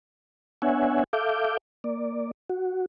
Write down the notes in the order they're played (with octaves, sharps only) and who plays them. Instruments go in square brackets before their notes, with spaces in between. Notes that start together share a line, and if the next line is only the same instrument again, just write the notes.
[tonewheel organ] B3 D4 C#5 E5 F#5 G#5
A4 E5 F5 D6 G6
A#3 D5
F#4